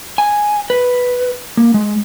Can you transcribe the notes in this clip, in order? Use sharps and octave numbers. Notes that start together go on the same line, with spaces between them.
G#5
B4
A#3
G#3